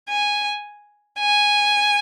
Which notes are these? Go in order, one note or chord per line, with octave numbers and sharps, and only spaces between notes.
G#5
G#5